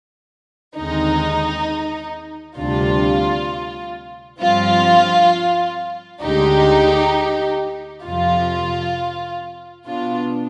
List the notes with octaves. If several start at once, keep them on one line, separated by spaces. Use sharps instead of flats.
D#2 D3 G#3 C4 D#4
D2 C3 G3 D4 F4
G2 F3 C4 F4
D2 D3 G#3 D#4 G4
F2 C3 F3 F4
B2 B3 D4 F4